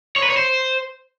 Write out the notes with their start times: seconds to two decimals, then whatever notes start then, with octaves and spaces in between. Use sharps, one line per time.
0.16 C#5
0.23 B4
0.30 C#5
0.37 C5